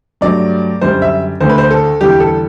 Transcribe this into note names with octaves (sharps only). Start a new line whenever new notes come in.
G2 F#3 A3 D5
F#2 D3 G3 C5
E5
D2 D3 A3 C5
B4
C5
A4
E2 D3 G3 G4
A4